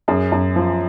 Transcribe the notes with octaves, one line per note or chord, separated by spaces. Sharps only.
F#2 G#4
F#2
F3